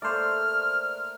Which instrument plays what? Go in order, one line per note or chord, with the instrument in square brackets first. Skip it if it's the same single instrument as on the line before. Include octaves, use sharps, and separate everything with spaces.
[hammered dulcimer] A3 A#3 [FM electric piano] C5 D5 [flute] F6